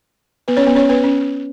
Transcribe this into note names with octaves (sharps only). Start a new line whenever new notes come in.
B3 B4
C#4 C#5
B3 B4
C#4 C#5
B3 B4
C#4